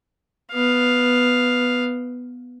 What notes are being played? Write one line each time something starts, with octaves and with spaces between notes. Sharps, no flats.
B3 F5